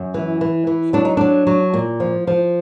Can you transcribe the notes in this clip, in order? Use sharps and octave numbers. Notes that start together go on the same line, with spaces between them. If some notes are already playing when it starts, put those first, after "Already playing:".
Already playing: F#2
E3
E3
E3
F#3 D4
D#4
F#3 D4
F#3
A#2
F3
F3